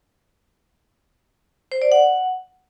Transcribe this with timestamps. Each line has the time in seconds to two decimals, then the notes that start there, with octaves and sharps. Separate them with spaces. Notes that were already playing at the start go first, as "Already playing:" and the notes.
1.72 C5
1.82 D5
1.92 F#5